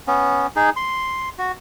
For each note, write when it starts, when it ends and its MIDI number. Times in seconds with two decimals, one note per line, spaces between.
0.07 0.47 59
0.07 0.47 61
0.56 0.70 63
0.56 0.70 68
0.76 1.29 84
1.38 1.52 66